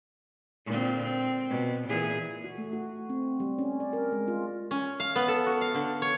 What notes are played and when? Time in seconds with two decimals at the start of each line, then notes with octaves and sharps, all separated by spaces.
0.66 A#2 D3 C4
1.02 C4
1.50 B2
1.89 A#2 E3 G#4
2.44 F#4
2.58 A3
2.73 F#4
3.09 C4
3.40 G3
3.59 C#4
3.80 D5
3.93 A#4
4.12 G#3
4.28 F4
4.71 C#4
5.00 F5
5.16 B3
5.28 A4
5.46 F#4
5.61 F5
5.74 D3
6.02 C#5